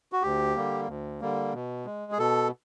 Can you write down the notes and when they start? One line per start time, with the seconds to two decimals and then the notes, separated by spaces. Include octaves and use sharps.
0.12 F#4
0.22 D2 G4
0.56 D3 G3 A#3
0.88 D2
1.21 D3 G3 A#3
1.54 B2
1.85 G#3
2.12 G#4
2.18 B2 A4